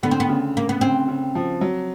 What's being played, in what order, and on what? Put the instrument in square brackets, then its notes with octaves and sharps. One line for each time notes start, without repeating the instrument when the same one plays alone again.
[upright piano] D3 [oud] B3
[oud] C4
B3
[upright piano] C#3
[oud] A#3
B3
[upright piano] C#3 [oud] C4
[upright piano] C#3
F3
F#3